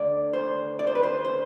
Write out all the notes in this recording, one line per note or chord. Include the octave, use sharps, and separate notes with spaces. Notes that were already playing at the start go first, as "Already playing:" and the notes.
Already playing: D2 D3 D5
C5
D5
C5
B4
C5
C5